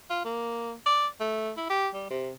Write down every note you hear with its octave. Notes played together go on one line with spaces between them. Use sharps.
F4
A#3
D5
A3
E4
G4
G3
C3